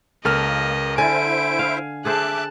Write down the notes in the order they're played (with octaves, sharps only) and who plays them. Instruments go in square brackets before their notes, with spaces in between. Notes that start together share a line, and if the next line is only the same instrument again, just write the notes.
[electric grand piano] C#2 A#4 F6 [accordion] A#3 [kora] A4 [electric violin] D#5
[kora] D3 [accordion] E4 C5 E5 [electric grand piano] G#5 [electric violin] D7
[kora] F5
[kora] G#4 A4 C5 [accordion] E5 D6 [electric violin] A5 F#6